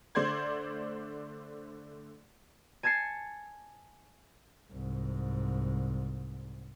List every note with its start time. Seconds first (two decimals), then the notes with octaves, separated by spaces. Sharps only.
0.15 D3 A3 C5 D5 C6 G#6
2.83 G#5 A5 G#6 A6 C7 C#7
4.72 C2 G#2